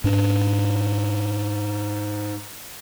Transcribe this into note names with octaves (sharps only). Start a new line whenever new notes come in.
G#2 D4